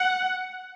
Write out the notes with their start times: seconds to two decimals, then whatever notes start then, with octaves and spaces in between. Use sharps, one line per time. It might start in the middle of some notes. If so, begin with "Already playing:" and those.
Already playing: F#5